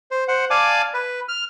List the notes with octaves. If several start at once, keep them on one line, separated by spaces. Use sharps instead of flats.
C5
C5 F#5
D5 F5 G#5 A5 D6
B4
F6